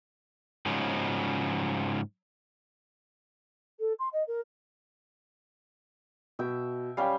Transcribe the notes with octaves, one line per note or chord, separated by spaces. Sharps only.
G#2 C#3 F3 F#3
A4
C6
D#5
A#4
B2 E5 G5
G3 C#4 F5 G5